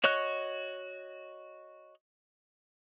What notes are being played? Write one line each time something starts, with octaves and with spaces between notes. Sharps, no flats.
F#4 C#5 D#5 C#6 F#6